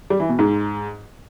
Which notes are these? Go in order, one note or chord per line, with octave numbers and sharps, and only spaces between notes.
G3
E3
B2
G#2